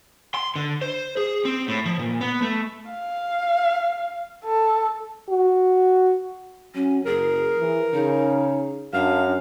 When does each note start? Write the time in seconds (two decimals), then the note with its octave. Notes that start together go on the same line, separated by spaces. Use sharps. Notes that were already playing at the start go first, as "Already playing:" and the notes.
0.34 C6
0.56 D3
0.81 C5
1.17 G#4
1.45 C4
1.68 A2
1.85 F3
1.99 A#2
2.21 B3
2.42 A3
2.91 F5
4.45 A4
5.29 F#4
6.75 F#3 C#4
7.05 F#1 G#4 A#4
7.58 E3
7.93 C#3 D#4
8.93 F#2 D4 F5